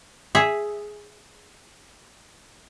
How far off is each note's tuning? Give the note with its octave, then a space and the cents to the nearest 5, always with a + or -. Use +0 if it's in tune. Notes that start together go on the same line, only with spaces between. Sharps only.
G#4 +0 E5 +0